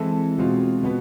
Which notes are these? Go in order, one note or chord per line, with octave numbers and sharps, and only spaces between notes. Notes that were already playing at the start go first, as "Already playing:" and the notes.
Already playing: E3 G#3 C4 E4 A4
B2 G#3 C4 F4
B2 B3